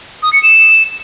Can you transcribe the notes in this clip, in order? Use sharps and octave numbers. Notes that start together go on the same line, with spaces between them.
D#6
C#7
E7